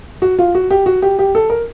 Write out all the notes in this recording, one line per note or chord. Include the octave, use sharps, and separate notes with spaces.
F#4
F4
F#4
G4
F#4
G4
G4
A4
A#4